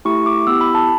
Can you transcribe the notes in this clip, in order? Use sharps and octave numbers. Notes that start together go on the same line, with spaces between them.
A3 E4 G4 C#6
D6
B3 E4 G4 E6
B5
A5